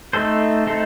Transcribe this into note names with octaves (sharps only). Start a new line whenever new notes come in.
A3 C4 D#4 A4 C5
A3 C4 D#4 A4 C5